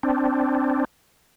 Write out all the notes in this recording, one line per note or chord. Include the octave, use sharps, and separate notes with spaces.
C4 D4